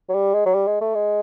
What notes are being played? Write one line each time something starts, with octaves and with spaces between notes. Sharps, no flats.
F#3
G3
G#3
F#3
G3
G#3
A3
G#3